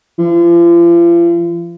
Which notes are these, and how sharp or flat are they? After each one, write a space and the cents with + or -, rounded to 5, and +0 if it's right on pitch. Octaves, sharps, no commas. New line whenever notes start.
F3 -40